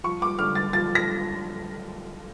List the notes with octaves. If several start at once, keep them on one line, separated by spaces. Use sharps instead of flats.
F3 C#6
D6
D3 F6
A6
F3 A6
A#6